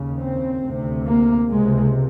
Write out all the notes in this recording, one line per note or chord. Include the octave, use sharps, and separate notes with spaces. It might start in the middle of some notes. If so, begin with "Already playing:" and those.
Already playing: D#2 C#3
C4
D2 C3
A#3
C#2 C3 G#3